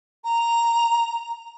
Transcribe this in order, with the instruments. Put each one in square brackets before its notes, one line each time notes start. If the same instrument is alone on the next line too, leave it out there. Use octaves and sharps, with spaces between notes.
[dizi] A#5